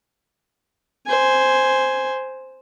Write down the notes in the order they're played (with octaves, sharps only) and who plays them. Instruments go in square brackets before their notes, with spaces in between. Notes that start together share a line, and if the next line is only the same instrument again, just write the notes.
[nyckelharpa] C5 G#5